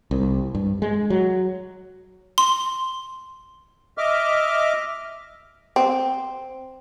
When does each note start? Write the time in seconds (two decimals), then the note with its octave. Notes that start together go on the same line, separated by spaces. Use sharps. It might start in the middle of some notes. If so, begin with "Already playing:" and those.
0.11 C2
0.55 G2
0.82 G#3
1.10 F#3
2.38 C6
3.98 D#5 E5 D6 F6
5.76 C4